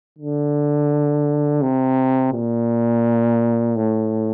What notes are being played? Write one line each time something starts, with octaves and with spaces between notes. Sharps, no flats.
D3
C3
A#2
A2